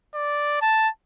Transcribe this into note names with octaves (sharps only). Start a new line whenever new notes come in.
D5
A5